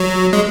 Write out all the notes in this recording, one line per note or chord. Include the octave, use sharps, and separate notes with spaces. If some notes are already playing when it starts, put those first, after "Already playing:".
Already playing: F#3
G#3